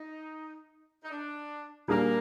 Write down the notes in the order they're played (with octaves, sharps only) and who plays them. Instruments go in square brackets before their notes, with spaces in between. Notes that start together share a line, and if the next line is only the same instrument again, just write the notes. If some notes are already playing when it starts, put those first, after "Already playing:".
Already playing: [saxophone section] D#4
D#4
D4
[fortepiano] A#2 G3 D4 G#4 [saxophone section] A#3